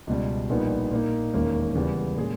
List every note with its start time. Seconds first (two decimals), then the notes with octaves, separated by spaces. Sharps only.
0.07 C#2 B2 G3
0.50 A#1 A#2 G3 B3 D#4
0.91 A#2 A#3 D#4
1.34 E1 D#2 D#3 A#3 C#4
1.75 E2 C#3 G3 B3 G4
2.17 A#2 G#3 C#4 G#4